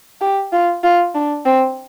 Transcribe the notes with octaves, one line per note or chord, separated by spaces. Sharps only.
G4
F4
F4
D4
C4